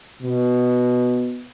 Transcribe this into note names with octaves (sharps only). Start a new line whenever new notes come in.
B2